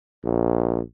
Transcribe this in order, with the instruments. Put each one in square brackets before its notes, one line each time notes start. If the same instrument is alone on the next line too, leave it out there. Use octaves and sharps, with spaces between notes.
[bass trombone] A#1